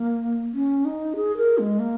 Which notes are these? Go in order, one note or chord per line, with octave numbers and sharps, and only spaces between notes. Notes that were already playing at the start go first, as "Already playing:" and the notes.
Already playing: A#3
C#4
D#4
G#4
A#4
G#3
A#3